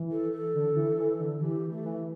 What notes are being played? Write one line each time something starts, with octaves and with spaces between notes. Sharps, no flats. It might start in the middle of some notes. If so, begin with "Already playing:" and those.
Already playing: E3
A4
A4
D3
E3
E3
D3
E3 G4
A3
E3